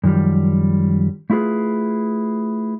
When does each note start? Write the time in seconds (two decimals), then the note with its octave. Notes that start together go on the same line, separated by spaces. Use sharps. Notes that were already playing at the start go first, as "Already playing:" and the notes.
0.04 F#2 D#3 F3 G3
1.30 A3 E4 F4 G#4 B4